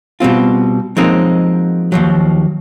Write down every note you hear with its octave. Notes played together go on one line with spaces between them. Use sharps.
B2 G3 C4 F4
F3 F#3 G#3 A#3 C4 D#4
D#2 F3 F#3